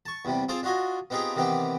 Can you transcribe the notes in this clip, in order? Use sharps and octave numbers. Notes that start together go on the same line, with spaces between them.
A5 C#6
E2 C3 G3
C4 F4 G#4 C5 F5 A5
D4 F4 F#4 D#5 G#5
B3 C4 D#4 F4 G4 G#4
C3 D#3 E3 B3 C4 G4